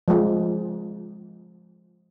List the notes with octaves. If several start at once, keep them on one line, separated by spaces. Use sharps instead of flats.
F3 G#3